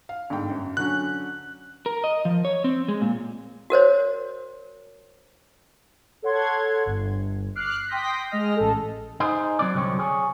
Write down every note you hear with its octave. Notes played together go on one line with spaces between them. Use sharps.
F5
G1 G#2 G5
F#2
D3 F#3 C#4 F#6
A#4
D#5
F3
C#5
C4
G#3
A#2
F#4 A#4 C5 C#5
A4 C#5 F#5 C6 G#6
G1
D6 F6 F#6 C7
G5 C6 D#6 G6 A#6 B6
G#3 D#5 F6 A#6
A1 A4
D#4 G#4 C5
F#3 C4 D5
C2 D3 F#3 C4 C#5
G#4 C#5